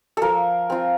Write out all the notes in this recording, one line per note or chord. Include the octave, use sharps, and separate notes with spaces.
F3 A4 A#4
C4 F4